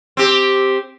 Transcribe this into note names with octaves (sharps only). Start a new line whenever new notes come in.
C4 G4